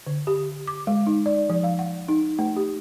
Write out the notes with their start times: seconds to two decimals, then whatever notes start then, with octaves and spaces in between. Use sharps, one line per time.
0.07 D3
0.27 G4
0.67 D6
0.87 G#3
1.07 D#4
1.26 D5
1.50 F3
1.64 F5
1.79 F#5
2.09 D#4
2.39 A3
2.57 G4